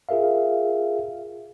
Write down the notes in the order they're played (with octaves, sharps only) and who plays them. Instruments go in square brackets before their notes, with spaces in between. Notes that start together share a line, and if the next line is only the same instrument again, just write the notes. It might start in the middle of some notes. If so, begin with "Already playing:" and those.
[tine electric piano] F4 G#4 A#4 E5 F5